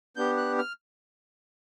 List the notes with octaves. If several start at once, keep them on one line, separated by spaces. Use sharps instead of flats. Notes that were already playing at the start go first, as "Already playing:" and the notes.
B3 D4 G4 G6
F#6
F6